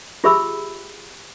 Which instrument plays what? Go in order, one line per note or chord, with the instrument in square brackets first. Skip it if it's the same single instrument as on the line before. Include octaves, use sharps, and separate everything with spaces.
[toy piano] F4 G4 G#4 E5 B5 E6